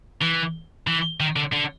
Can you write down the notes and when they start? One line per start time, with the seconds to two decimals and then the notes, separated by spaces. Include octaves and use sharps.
0.22 E3
0.87 E3
1.20 D#3
1.36 D3
1.53 D3